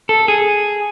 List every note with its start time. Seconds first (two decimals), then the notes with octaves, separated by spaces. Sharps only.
0.09 A4
0.28 G#4